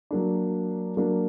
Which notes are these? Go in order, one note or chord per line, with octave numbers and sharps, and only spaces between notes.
F#3 A#3 D4
F#3 A#3 D4